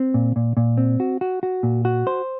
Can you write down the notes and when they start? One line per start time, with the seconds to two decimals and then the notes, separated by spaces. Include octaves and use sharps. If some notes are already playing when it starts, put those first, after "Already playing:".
Already playing: C4
0.14 A#2
0.36 A#2
0.57 A#2
0.78 C4
1.00 F#4
1.21 F#4
1.43 F#4
1.63 A#2
1.85 F#4
2.07 C5